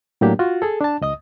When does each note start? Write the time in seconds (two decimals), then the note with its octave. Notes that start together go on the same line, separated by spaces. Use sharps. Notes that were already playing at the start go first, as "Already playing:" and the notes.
0.21 A2 F#3 A#3 D4 G4
0.39 F4 F#4
0.62 G#4 A4
0.81 D4 A5
1.01 C#2 D#5 D#6